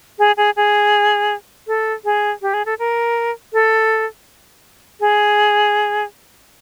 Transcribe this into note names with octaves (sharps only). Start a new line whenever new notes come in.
G#4
G#4
G#4
A4
G#4
G4
G#4
A4
A#4
A4
G#4